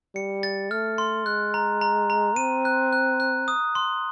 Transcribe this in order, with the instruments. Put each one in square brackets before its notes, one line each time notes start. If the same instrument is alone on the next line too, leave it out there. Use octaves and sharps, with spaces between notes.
[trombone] G3 [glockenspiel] C#7
[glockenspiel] A6
[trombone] A3 [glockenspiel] F6
[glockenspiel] C6
[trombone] G#3 [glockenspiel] F#6
[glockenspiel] A#5
A#5
A#5
[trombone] C4 [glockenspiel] D#7
[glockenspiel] F#6
F#6
F#6
D#6
C6